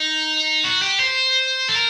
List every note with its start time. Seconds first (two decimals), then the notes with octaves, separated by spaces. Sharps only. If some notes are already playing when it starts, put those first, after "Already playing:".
Already playing: D#4
0.64 F#4
0.82 G4
1.00 C5
1.69 A4
1.75 A#4